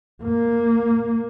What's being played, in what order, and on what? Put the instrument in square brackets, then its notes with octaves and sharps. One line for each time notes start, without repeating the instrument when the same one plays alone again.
[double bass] A#3